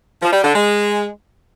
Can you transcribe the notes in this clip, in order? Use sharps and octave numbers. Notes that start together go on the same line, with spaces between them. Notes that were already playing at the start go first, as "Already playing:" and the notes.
F3
G3
D3
G#3